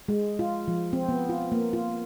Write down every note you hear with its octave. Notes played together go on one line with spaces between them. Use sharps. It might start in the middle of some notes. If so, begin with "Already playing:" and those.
G#3
F4
F3
C4
B3
F4
A#3
F4